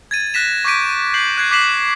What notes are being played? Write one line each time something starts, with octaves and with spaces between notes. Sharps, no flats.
G#6 A6 D#7
F#6 A#6 B6 E7
C#6 D6 G6 B6 D7 D#7
G6 C7 F#7
F#6 G#6 C7
D6 F#6 B6 C7 E7 F#7